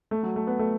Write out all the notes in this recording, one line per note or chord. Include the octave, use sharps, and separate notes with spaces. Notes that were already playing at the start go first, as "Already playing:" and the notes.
A3
F#3
A3
B3
A3